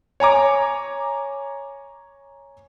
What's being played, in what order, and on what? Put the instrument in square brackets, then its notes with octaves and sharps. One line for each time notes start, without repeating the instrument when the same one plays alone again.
[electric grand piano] C#5 G#5 A#5 D6